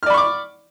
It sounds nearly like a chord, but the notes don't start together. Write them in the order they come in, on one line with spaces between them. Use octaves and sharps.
F6 D5 B5 C#6 D6